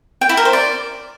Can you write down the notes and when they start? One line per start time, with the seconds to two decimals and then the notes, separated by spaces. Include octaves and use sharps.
0.21 G5
0.29 E4
0.37 A#4
0.45 C5
0.53 D5